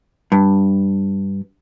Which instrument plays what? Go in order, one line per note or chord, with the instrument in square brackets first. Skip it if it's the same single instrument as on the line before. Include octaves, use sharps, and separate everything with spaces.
[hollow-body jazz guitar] G2